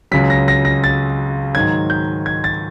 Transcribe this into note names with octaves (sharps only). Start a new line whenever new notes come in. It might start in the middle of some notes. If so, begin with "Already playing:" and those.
C#2 C#3 F#3 B6
A#6
A#6
A#6
A6
G#2 D#3 F#3 G#6
G6
G#6
A6